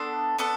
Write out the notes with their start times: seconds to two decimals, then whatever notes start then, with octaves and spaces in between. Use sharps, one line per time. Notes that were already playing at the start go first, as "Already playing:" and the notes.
Already playing: B3 D4 A4 C6
0.38 B3 D4 A4